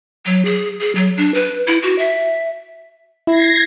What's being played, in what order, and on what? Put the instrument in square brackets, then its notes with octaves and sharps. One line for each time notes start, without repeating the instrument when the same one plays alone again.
[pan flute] F#3
G#4
G#4
F#3
D4
B4
E4
F#4
E5
[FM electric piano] E4 [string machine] G#6 A#6 C7